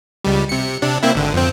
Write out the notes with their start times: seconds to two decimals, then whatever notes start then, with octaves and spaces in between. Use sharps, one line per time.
0.24 C#2 G3
0.49 C3 C#7
0.82 C3 D4
1.03 A#3 C4 E4
1.15 G#1 D3
1.33 F2 C4